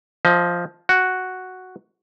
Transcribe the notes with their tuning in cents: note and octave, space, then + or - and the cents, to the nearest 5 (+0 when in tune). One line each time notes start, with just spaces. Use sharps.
F3 +0 D#5 +30
F#4 +0 G#5 -35